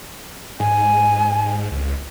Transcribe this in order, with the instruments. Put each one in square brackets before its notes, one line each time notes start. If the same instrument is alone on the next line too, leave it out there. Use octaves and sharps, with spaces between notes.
[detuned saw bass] G#2 [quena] G#5
[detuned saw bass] C#2